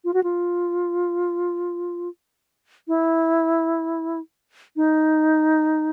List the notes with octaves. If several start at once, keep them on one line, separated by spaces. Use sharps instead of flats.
F4
F#4
F4
E4
D#4